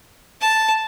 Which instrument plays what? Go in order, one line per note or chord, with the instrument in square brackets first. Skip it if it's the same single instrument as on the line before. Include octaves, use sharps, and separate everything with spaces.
[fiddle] A5